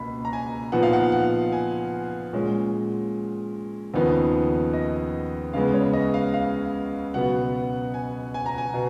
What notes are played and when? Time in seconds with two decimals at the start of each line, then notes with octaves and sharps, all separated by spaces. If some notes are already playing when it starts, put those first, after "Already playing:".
Already playing: C#2 B2 A#3 B5
0.25 A#5
0.33 G#5
0.72 A#2 F3 B3 D#4 F#5
0.83 F5
0.93 F#5
1.12 F#5
1.52 G#5
2.33 A#2 G#3 C#4
3.93 D#2 C#3 F3 B3 D#4
4.73 D#5
5.53 C#2 C#3 G#3 B3 F5
5.73 C#5
5.93 D#5
6.14 F5
6.34 F5
7.14 C#2 B2 F#3 B3 F#5
7.94 G#5
8.34 G#5
8.46 A#5
8.58 G#5
8.74 B2